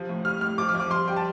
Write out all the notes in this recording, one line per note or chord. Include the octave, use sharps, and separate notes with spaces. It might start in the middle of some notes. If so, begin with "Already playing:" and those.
Already playing: C3 F3
A2
G3 F6
A2 F6
F3 D6
F6
F3 D6
G3 C6
G3 G5
A5